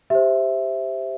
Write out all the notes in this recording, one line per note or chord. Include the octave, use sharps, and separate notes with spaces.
G4 C5 E5